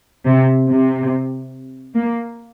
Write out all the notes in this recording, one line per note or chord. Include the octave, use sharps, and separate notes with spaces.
C3
C3
A#3